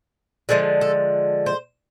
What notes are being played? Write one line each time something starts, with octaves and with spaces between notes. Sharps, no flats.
D3 F3 G#3 G#4
A4
C5